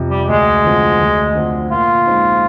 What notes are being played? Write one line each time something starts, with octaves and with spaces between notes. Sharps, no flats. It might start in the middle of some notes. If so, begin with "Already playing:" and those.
Already playing: F2 C3 F3
G3
D2 G#3
D3 F3 C4
D2
D3 F3 C4
A#2 F4
G#3 C4 D#4